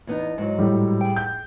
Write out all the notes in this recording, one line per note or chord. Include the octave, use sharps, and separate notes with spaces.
E2 B3 D#4
G#2 F#3
A2 G3
G#4 G5
G6